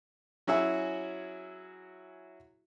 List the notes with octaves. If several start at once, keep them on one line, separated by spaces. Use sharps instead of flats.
F#3 C#4 E4 F#4 G#4 E5